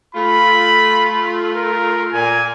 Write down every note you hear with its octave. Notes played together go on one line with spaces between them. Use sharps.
A3 F4 B5
A#4
A#2 G#5